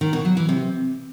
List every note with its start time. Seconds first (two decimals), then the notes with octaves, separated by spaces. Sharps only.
0.01 D#3
0.13 B2
0.25 F#3
0.37 E3
0.49 C3